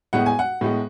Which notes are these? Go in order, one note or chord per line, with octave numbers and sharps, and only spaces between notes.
A2 G#3 B3 F#5
G#5
F#5
A2 G#3 B3